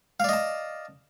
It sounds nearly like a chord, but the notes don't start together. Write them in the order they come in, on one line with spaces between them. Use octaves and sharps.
F5 D5 D#5 A5